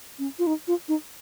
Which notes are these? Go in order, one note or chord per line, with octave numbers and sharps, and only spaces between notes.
C#4
F4
D#4
F4
D#4